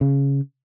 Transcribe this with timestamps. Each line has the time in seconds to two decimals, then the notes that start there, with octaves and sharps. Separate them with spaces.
0.01 C#3